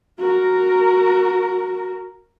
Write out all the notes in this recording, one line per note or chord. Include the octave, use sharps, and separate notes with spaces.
F#4 A#4